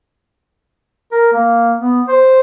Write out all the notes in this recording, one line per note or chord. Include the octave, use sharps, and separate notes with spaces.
A#4
A#3
B3
C5